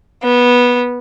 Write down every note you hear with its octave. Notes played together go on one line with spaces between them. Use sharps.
B3